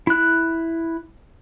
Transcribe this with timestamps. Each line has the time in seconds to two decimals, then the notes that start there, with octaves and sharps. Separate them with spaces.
0.07 E4 F#6